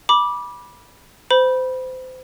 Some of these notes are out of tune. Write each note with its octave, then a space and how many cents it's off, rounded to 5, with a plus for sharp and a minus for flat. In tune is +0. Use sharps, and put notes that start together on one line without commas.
B5 -20 D6 +0
C5 -30 B5 -15